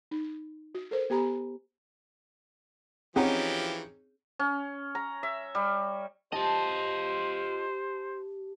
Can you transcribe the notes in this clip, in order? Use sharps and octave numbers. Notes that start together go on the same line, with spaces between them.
D#4
F#4
A4 A#4 C5
B3 G4 G#5 A#5 B5
E3 F3 C4 C#4 D#4 G4 G#4 F#5
C#4
A#5
E5
G3
F4 G4 C5 D#5 A5